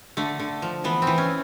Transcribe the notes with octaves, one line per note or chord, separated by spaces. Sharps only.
D3 A3
D3
F3
E3 B3
C4
E3
C#4